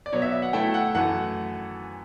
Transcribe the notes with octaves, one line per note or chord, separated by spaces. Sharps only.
D5
B2 F#3 B3 C#5
E5
E5
F#5
B2 A3 E4 G5
F#5
F#2 E3 A3 F#5